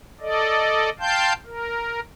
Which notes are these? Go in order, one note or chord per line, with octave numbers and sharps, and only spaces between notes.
A4 D5 D#5
F5 G5 A5 C6 G6
A#4